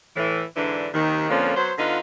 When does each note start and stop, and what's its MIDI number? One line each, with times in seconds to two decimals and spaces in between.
0.16 0.43 45
0.16 0.43 52
0.56 0.89 44
0.56 0.89 50
0.56 0.89 52
0.56 0.89 62
0.93 1.29 39
0.93 1.29 48
0.93 1.29 51
1.30 1.53 41
1.30 1.53 50
1.30 1.53 53
1.30 1.53 58
1.30 1.53 61
1.56 1.72 54
1.56 1.72 59
1.56 1.72 72
1.78 1.98 50
1.78 1.98 59
1.78 1.98 63
1.78 1.98 65